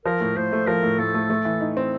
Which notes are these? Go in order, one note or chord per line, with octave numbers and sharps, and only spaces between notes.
F3 A#4
A2
A2 C5
A3
F3 A#4
A2
A2 A4
A3
A3
E3
D#4
C4